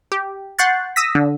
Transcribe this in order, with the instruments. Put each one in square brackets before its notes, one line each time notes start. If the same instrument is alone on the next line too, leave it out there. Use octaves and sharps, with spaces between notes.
[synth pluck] G4
F#5 C6 C#6 F#6 G6 A6
D#6 E6 A#6 B6
D3